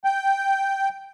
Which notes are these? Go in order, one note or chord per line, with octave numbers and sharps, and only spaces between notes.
G5